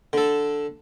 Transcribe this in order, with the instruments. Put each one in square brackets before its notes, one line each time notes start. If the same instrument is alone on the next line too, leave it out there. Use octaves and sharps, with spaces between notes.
[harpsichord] D3 A4